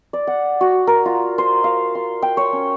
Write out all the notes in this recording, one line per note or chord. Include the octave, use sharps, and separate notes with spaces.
D5
F#5
F#4
A#4
F4
C5
F5
C6
G5
C#5
C#4